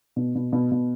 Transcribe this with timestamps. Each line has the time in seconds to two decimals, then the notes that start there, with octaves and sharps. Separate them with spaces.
0.16 B2
0.35 B2
0.52 B2
0.71 B2